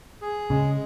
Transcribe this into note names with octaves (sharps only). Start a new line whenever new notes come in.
G#4
C#3 G#3